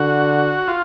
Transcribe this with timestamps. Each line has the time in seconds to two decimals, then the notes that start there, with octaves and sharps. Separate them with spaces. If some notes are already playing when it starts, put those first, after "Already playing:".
Already playing: D3 F#4
0.68 F4